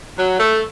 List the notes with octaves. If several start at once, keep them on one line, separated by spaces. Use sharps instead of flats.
F#3
A3